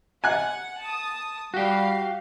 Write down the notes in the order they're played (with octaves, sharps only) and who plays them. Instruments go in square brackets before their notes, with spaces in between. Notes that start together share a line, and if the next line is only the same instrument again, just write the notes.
[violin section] F#5 [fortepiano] G#5 F#6
[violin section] A5 D#6
[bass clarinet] G3 [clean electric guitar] F#4 G4 [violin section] F5